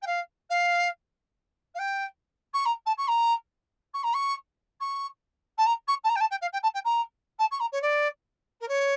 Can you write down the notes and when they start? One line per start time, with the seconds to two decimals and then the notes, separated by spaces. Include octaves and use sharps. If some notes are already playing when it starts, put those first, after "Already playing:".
0.02 G5
0.06 F5
0.50 F5
1.74 F5
1.79 G5
2.53 C#6
2.65 A#5
2.86 A5
2.97 C#6
3.07 A#5
3.94 C#6
4.03 A#5
4.14 C#6
4.80 C#6
5.58 A5
5.66 A#5
5.88 C#6
6.04 A5
6.09 A#5
6.16 G5
6.20 A5
6.30 G5
6.41 F5
6.53 G5
6.63 A5
6.74 G5
6.84 A#5
7.39 A5
7.51 C#6
7.60 A#5
7.72 C#5
7.82 D5
8.60 A#4
8.68 C#5